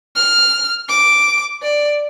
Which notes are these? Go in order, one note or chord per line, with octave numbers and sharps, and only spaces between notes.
F6
D6
D5